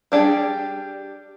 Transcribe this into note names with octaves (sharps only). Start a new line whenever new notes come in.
G3 D4 G4 G#4